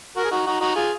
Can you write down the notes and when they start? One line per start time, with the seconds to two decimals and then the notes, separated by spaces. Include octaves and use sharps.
0.17 F#4 A#4
0.24 G#4
0.31 D#4 F#4
0.46 D#4 F#4
0.61 D#4 F#4
0.75 F4 G#4